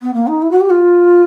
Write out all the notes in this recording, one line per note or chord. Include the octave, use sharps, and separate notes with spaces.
B3
A#3
D#4
E4
F#4
G4
F4